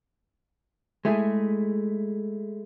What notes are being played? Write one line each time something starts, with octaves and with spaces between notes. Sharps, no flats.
G#3 A3 E4 G#4